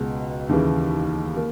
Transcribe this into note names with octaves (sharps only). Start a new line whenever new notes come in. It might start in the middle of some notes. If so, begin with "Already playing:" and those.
Already playing: C#2 B2 G#3
D#2 C#3 E3
A#3